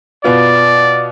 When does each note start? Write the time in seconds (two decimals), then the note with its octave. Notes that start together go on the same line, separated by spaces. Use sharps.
0.24 B2 B3 F4 D5